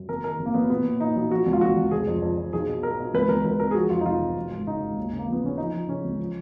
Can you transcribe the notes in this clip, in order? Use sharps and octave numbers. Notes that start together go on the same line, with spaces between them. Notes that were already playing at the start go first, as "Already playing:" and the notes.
Already playing: F#2
F#1 A#4
D#3 A#4
F#1
A#3
F#2 B3
A#2 B3
A#2
A#2 D#4
B1
F3 F#4
C#2
F4
C#2 F#4
C#2
F1 G#4
F2
F2
F2
B1 G#4
B2
B2 A#4
B2
C#2 B4
C#2 A#4
C#2 B4
C#2 A#4
G#4
F3 F#4
F2 F4
D#4
F1 F4
F1
F#2
G#1
C#3 D#4
G#1
D#2
C#3
A#3
F3
B3
C#3 C#4
F3 D#4
F3
C#3 C#4
C#2
F3